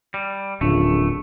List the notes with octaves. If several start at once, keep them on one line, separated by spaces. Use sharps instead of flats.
G3
D1 A#1 C#3 A3